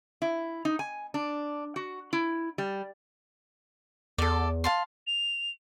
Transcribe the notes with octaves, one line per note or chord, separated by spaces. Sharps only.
E4
D#4
G#5
D4
F#4
E4
G3
E2 A4 D5
F5 A5 C6
F7